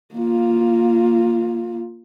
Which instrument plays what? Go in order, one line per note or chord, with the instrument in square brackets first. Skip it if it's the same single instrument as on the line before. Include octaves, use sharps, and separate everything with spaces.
[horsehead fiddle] A#3 F4